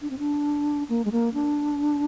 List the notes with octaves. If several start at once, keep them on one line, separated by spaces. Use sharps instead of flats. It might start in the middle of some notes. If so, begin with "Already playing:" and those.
D4
C4
D4
A#3
G#3
A#3
D4